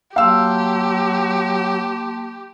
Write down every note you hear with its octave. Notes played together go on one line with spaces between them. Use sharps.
F#3 A#3 G4 F5 A5 C6 E6